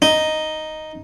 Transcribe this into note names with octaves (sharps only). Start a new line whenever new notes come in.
D#4